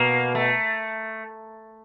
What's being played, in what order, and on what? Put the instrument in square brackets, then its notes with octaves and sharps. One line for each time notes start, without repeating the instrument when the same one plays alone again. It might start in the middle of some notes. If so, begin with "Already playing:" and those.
Already playing: [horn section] B2 [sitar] A#3
[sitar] A3